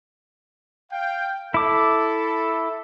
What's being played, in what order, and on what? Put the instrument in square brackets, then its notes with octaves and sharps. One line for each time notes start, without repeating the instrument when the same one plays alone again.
[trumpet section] F5 G5
[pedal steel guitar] E4 D6 [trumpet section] A4